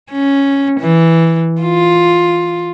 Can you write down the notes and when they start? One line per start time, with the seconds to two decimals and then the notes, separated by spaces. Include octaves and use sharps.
0.11 C#4
0.80 E3
1.62 F4